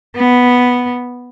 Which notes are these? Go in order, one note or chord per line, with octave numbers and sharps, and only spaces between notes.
B3